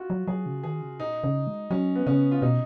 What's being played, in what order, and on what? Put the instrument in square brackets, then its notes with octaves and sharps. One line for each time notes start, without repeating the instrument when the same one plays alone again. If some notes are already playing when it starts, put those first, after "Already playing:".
Already playing: [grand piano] F4 F#4
[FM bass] F#3
[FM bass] F#3 [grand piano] G#4
[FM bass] C#3
[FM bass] D#3 [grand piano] G#4
[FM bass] C#3
[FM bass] A#2 [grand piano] D#4
[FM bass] C#3
G#3
[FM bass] F#3 [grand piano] C#4
[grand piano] B3
[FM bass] C#3 [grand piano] C#4
[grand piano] F4
[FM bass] B2 [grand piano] D#4